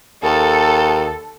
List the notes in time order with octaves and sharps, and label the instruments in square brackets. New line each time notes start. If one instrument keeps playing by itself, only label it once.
[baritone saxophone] D#2 [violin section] A4